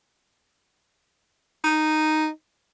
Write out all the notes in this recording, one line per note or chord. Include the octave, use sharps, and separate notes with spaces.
D#4